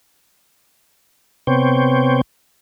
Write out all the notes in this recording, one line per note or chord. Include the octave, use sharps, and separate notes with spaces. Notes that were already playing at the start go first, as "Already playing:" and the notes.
C3 B3 C5 C#5 G5